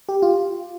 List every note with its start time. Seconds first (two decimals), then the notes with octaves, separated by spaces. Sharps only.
0.09 G4
0.22 F4